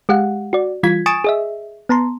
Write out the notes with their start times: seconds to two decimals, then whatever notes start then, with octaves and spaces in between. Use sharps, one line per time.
0.09 G#3 G4 F5 F#5
0.53 F#4 D5
0.83 E3 G3 F4 G#6 B6
1.06 G#5 C#6 D#6 A6 D7 E7
1.24 G#4 D#5 E5
1.89 B3 A5 A#5 C6